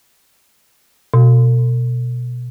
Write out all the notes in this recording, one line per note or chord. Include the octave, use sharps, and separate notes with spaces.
B2